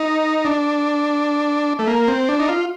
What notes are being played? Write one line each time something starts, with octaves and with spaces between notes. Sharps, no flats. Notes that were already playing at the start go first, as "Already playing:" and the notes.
Already playing: D#4
D4
A3
A#3
C4
D4
D#4
F4